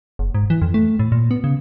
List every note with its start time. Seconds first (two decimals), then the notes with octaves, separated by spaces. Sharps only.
0.19 F#1
0.35 G#2
0.50 E3
0.62 F2
0.74 A3
0.99 A2
1.12 A#2
1.31 B3
1.44 C#3